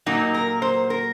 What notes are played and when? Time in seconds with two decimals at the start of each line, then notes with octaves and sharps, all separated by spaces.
0.06 A#2 F#3 A#3 D#4
0.34 A#4
0.62 C5
0.90 A#4